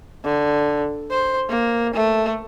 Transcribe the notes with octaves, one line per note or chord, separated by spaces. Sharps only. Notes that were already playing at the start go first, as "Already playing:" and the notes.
D3
C5
A#3
A3